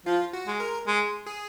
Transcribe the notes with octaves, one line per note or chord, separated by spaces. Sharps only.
F3 F4
F#4
G#3
A#4
G#3
G#4